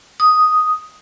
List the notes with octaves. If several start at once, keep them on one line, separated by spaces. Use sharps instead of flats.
D#6